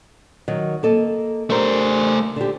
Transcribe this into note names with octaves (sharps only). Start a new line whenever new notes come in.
D#3 F#3
A#3 A4 D#5
A3 D4 G4 A#4 C5
D3 G4